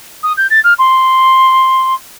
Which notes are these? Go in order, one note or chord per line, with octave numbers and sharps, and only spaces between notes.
D#6
G6
A6
F6
C6